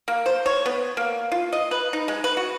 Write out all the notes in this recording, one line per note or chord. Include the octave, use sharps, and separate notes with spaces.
A#3
C5
C#5
B3
A#3
F4
D#5
B4
D#4
G#3
B4
F#4